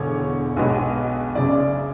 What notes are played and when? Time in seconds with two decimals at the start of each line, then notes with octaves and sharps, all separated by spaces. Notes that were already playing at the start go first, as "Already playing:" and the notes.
Already playing: E1 E2 D3 C#5
0.56 B1 B2 G#3 B3
1.35 F#1 F#2 C#3 D5